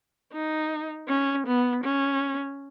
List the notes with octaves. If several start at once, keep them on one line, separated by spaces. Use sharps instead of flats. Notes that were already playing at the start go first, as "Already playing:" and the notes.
D#4
C#4
B3
C#4